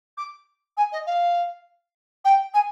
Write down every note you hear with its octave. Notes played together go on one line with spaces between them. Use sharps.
D6
G#5
D#5
F5
G5
G#5